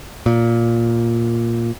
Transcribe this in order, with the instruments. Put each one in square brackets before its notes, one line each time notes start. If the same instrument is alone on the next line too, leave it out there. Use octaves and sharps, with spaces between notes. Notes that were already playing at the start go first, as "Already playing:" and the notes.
[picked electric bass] A#2